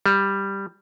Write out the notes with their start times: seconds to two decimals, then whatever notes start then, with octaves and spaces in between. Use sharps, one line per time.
0.06 G3